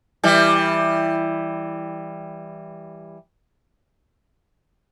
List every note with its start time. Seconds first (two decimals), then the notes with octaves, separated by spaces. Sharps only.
0.23 E3 G3